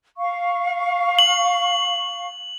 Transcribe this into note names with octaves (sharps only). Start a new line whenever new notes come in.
F5 C#6
F#7